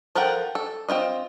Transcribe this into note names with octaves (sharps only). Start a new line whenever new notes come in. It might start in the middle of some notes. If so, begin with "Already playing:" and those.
F3 A4 A#4 F#5 G5
A4
C4 E4 F4 D#5